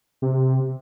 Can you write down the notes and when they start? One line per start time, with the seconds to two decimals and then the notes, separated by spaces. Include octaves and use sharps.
0.22 C3